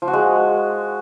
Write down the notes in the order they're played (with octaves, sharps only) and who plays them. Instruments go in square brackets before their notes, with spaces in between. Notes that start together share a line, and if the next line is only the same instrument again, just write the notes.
[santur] F3
F#4
G#3